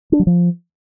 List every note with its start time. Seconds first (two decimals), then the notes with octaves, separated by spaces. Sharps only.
0.12 D4
0.19 F#3
0.27 F3